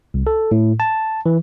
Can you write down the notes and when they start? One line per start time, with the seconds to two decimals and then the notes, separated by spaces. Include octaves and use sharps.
0.14 C2
0.27 A4
0.51 A2
0.80 A5
1.26 E3